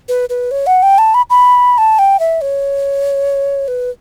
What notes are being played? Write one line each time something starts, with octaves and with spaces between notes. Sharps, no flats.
B4
B4
C#5
F#5
G5
A5
B5
B5
A5
G5
E5
C#5
B4